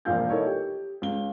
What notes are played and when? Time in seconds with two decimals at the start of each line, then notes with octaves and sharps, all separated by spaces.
0.05 E1 A#1 A#2 F3 F5 G6
0.30 D#4 E4 A4 A#4 C#5
0.46 G4
1.02 C#2 G7